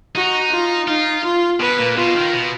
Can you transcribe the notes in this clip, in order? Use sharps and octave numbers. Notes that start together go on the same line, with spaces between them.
D#4 F#4
F4
D#4 F4
F4
B2 B4
A#2
B2 F4
D#3
B2